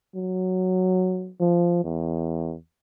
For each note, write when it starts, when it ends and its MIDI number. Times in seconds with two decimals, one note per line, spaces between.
0.15 1.32 54
1.40 1.79 53
1.84 2.55 40